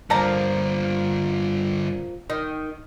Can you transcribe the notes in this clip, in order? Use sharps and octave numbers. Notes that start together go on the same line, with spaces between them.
G2 D3 F3 A#3 A4 D5 A#5
D#3 D#5